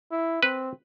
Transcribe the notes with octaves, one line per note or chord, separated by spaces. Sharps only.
E4
C4 B4